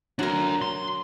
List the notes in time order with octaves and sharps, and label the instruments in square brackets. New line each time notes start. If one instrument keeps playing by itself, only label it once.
[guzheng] F#3 A#4 [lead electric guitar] D4 F#4
[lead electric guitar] C6